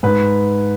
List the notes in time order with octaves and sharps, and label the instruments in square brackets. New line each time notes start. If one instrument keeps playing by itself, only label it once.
[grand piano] G#2 B4